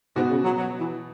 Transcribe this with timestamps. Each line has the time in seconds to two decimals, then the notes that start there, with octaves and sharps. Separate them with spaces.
0.16 G#2 B2 B3 F#4
0.30 C#3
0.44 F#3
0.58 F#3
0.79 E3